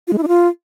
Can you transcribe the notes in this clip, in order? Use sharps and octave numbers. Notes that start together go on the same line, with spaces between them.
F4
G#3
E4
D4
F4